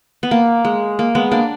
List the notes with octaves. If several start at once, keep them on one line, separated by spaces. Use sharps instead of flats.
B3
A#3
G#3
A#3
G#3 B3
A#3 D4